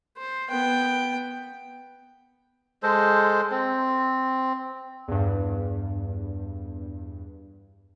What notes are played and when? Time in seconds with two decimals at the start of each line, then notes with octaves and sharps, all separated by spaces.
0.18 C5
0.50 B3 G5
2.83 G#3 A4 C5
3.51 C4
5.08 E2 G2